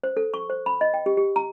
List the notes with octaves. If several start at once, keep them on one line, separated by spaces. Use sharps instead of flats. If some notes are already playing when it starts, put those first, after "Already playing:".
C5
A4
C#6
C5
B5
D#5
G5
G4
G4
A#5